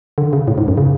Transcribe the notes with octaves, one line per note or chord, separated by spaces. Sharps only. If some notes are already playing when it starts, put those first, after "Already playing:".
D3
C#3
A2
G#2
F#2
C#3